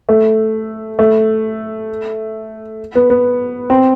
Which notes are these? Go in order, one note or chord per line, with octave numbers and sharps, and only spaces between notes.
A3
A3
B3
B3
C4